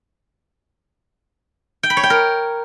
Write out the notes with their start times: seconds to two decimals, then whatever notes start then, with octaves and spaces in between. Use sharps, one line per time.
1.83 G5
1.90 B5
1.97 C#5
2.03 G5
2.10 A#4